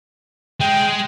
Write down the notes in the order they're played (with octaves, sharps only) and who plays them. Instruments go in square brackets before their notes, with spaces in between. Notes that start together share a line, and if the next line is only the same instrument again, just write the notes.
[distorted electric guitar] G#3 [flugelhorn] G5